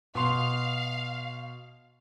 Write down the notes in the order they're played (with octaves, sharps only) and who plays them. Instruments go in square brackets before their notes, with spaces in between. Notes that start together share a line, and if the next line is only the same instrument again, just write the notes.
[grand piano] B2 C6 F7 [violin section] F5